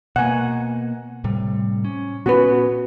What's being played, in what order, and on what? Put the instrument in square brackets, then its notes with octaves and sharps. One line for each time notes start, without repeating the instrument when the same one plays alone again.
[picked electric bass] B2 A#3 [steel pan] F#5 G#5
[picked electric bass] A2 C3 G3
C#4
[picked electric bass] A#2 B3 C#4 [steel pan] F#4 B4